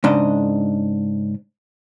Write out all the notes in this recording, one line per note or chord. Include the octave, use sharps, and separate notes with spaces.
G#2 C#3 D4 D#5